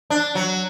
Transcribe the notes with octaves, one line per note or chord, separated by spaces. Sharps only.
D4
F#3